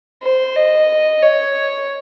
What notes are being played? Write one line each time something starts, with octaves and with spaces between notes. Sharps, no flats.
C5
D#5
C#5